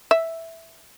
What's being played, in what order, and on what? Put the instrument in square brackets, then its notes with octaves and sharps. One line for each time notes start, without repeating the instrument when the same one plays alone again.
[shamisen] E5